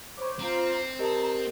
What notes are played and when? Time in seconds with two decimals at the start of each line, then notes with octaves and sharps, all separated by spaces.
0.17 C5 C#5 B5 C#6 D6
0.39 C4 F4 C5 A#5
0.99 G4 A#4 D#5 A5 A#5